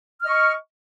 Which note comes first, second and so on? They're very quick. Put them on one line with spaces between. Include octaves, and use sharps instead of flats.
F6 D#5 C#6